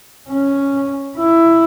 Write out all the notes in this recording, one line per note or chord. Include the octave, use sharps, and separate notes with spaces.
C#4
E4